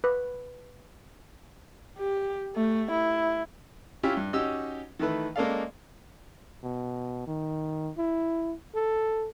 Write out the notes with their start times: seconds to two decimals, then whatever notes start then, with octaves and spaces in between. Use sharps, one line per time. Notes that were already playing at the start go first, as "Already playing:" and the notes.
0.04 B4
1.99 G4
2.56 A3
2.92 E4
4.03 C#4 E4 F4 G4 E5 G5
4.17 G2
4.33 C#4 D#4 F#4 G4 E6
4.99 D#3 E3 A3 B4
5.36 G#3 A#3 C#4 A4 D5 F5
6.64 B2
7.27 D#3
7.97 E4
8.75 A4